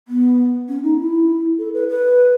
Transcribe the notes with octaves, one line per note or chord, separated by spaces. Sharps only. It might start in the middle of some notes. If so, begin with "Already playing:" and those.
B3
C#4
D#4
E4
A4
B4
B4